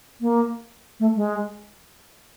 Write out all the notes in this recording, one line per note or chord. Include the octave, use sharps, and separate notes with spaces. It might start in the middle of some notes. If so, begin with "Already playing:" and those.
A#3
A3
G#3